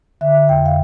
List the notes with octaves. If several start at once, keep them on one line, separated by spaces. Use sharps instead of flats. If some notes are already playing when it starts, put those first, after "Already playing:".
D3 E5
F2 G5
F5